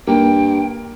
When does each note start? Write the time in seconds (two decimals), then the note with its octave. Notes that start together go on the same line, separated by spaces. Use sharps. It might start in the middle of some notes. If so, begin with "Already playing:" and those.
0.07 G2 A#3 G5